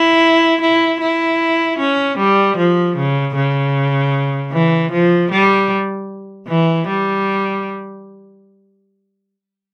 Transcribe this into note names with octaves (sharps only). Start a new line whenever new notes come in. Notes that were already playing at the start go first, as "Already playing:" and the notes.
Already playing: E4
E4
E4
C#4
G3
F3
C#3
C#3
E3
F3
G3
E3
G3